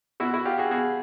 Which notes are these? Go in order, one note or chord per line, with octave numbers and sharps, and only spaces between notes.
B2 E4 F#4
E4 F#4
F4 G4
F#4 G#4
B2 F#4 G#4